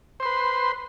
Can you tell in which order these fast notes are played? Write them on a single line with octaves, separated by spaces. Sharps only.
C5 C6 B4